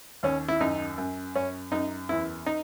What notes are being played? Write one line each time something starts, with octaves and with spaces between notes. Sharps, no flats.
D#2 C#4
E4
F#2 D#4
F#2
F#2 C#4
F#2 D#4
E2 E4
D#4